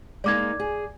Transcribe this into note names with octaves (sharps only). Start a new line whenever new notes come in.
G#3 A#3 D#4 D5 D6 G#6
G#4